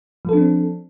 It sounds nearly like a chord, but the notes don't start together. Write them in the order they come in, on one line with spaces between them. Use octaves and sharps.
F3 A4 D4 C4